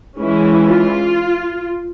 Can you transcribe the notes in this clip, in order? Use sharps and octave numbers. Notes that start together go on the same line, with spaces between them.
E3 G#3 C#4 E4
F4